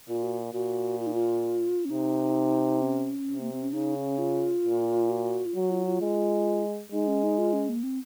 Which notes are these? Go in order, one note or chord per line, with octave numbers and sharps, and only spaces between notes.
A#2 F4
F#4
A#2 F#4
F4
D#4
F4
C#4
C3 D#4
C#4
C3
A#3
C4
C#4
C#3 D#4
C#4
F4
A#2
F#4
F4
F#3 F#4
F4
F4
G#3
G#3 D#4
C#4
D#4
F4
C#4
A#3
C4